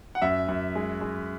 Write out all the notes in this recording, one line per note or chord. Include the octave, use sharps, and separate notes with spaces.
F#5
F#2 E5
F#2
G#3
G#3